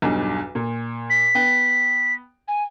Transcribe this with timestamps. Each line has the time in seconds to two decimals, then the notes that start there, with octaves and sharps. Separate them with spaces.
0.02 B1 E2 G2
0.55 A#2
1.10 B6
1.35 B3 G5
2.48 G#5